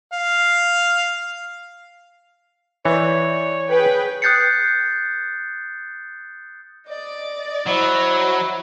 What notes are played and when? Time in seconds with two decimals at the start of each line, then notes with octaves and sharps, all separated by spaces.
0.13 F5
2.85 E3 A3 B4 C#5 D5
3.70 G#4 B4 G5
4.22 D#6 F#6 G6 A6 C7 C#7
6.87 D5 D#5
7.67 F#3 E4 C5